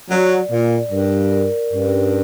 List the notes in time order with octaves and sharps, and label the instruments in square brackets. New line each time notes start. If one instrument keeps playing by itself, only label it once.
[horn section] F#3 [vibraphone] D5
[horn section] A#2 [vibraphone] D5
[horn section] G2 [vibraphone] A#4
[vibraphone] A#4
[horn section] G2 [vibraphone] C#4